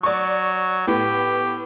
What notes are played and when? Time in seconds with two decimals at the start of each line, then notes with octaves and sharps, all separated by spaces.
0.03 F#3 D5 C#6
0.87 A2 B3 G4